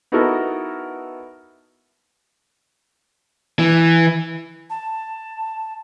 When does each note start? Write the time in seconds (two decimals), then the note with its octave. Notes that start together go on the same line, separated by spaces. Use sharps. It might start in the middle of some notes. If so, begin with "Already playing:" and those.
0.12 B3 D#4 E4 F#4 A4 A#4
3.59 E3
4.70 A5